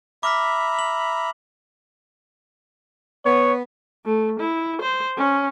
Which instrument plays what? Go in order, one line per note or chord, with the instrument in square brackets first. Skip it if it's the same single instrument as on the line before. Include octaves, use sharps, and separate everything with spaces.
[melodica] E5 A#5 B5 [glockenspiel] D6 F6 B6
[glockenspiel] F#7
[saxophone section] B3 [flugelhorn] C#5
[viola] A3
E4
C5
C#4